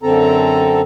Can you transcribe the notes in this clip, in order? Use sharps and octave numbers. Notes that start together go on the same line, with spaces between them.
F#2 D3 C4 A4 A#5